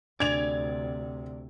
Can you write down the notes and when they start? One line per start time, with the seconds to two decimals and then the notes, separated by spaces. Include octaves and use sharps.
0.20 D2 C3 D4 D5 G#6 F7